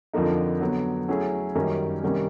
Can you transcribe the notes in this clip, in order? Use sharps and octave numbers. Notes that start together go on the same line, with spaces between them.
F2 D3 F3 A#3 D#4
D3 F#3 B3
F#3 A3 C#4 E4 G#4
F#2 D#3 G3 A#3 C#4
C3 D#3 G3 A#3 C#4